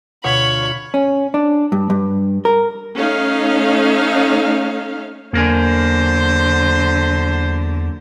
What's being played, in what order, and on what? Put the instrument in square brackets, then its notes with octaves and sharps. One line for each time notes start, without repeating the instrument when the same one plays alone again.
[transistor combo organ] D2 F4 C#6 [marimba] B2 F#5 [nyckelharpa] C#5 [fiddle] B5
[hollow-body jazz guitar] C#4
D4
G2
G2
A#4
[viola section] A3 C#4 D#4 F5
[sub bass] E2 [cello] D3 F#3 [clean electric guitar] A#3 A#4 G#5 [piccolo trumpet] C5